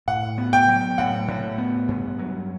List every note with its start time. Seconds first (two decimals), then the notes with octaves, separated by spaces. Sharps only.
0.08 A2 F#5
0.38 B3
0.53 G5
0.68 F#3
0.98 A2 F#5
1.28 A2
1.58 B3
1.88 G2
2.19 F#3